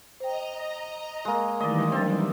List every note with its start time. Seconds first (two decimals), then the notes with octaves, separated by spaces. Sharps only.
0.20 C5 D#5 G5 A#5
0.60 A#6
1.25 G#3 A#3
1.61 D#3 E3 G3 A3 D5 D#5
1.92 F#3 C4 D4 A6